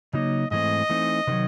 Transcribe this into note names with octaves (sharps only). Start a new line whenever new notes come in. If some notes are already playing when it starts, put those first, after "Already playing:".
C#3 F#3 A#3 D#4 D#5
G#2 E3 A3 C4 D#5
E3 A3 C4 D#4
C3 D#3 F#3